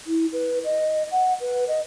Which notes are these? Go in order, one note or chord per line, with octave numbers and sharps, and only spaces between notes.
E4
B4
D#5
F#5
B4
D#5